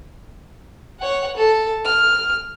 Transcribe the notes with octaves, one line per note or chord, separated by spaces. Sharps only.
C#5 F#5
A4
F6